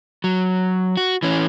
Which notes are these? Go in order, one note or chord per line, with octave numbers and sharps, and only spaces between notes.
F#3
F#4
E3 C#4